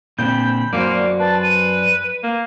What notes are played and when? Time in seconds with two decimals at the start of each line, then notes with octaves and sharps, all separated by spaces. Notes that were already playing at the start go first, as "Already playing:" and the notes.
0.19 A#2 D3 C4 B5 G6
0.73 F#2 A#3 F#4 C5 D5
1.20 B4 A5
1.43 D#7
2.23 A#3